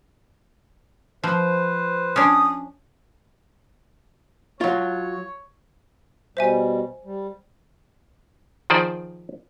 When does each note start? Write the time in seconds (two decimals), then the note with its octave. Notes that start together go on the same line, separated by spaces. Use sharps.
1.24 F3 B4 C5
2.16 C#4 D4 D#6
4.61 F#3 F4 C#5
6.37 B2 G3 C5 E5 G#5
7.04 G3
8.70 D#3 F3 G#4 C5 D5